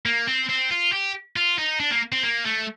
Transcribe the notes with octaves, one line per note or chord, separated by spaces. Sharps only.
A#3
C4
C4
F4
G4
F4
D#4
D4
A#3
C4
A#3
A3